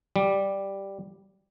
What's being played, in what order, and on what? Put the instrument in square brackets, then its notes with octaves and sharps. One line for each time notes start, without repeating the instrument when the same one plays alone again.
[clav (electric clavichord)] G3